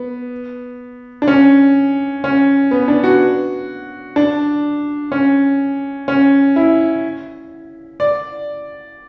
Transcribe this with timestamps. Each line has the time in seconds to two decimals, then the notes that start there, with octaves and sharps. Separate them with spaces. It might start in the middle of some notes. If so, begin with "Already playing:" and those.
Already playing: B3
1.22 D4
1.28 C#4
2.24 C#4
2.71 B3
2.88 D4
3.04 F#4
4.16 D4
5.12 C#4
6.08 C#4
6.56 E4
8.00 D5